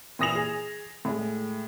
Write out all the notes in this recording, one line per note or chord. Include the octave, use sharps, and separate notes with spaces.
A#2 E3 D#6 A#6 E7 F7
G#4
A2 G#3